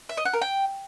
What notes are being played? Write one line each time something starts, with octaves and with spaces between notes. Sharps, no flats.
E5
D#5
F#5
A#4
G5